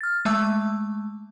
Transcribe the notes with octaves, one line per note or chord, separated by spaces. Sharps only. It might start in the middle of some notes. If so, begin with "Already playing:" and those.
F6 A6
G#3 A3 E5 A5 E6